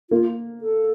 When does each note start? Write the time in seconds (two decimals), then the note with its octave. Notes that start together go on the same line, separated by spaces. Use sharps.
0.10 A#3 F4
0.61 A4